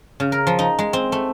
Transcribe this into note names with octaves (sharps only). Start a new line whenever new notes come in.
C#3
A#4
F3
D#4
G#3
C4
A3